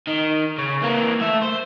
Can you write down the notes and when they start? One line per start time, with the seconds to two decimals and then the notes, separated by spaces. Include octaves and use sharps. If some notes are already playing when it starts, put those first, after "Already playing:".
0.07 D#3
0.58 C#3
0.82 E3 A#3
1.21 A3 E5
1.42 C5